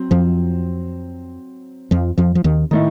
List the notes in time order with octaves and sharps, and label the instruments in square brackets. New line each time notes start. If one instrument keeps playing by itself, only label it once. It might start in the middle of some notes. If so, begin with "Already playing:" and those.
Already playing: [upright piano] F#3 C4
[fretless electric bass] F2 F3
F2 F3
F2 F3
F3
D#2 D#3
[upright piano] A2 A3 D#4 [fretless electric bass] D#3